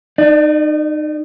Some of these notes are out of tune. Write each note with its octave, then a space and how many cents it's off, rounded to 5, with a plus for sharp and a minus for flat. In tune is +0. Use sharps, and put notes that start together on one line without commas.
D#4 -25 D5 +25